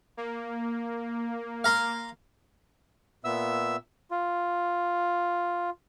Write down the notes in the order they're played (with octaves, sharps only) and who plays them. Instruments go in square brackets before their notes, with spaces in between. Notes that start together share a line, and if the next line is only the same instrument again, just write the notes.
[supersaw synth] A#3
[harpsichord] F5 A#5 C6
[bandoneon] A#2 B3 E5 E6
F4